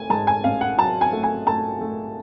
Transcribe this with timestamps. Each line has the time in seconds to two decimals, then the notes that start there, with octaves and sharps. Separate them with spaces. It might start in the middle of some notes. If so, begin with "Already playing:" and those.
Already playing: A3 G#5
0.10 G#2 A5
0.27 G#5
0.44 A1 F5
0.61 F#5
0.78 F#3 A5
1.01 G#5
1.12 A3
1.23 G#5
1.46 A3 A5
1.81 A3